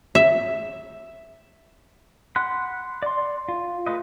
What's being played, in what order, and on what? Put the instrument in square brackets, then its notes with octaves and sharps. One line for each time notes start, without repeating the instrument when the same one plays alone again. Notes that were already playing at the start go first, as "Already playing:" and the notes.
[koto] E5
[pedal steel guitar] F#5 B5 C6 F#6
D5 C6
F4
G#3 A3 B4 D#5